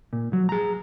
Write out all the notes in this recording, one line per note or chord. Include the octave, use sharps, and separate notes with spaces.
A#2
F#3
G#4 A#5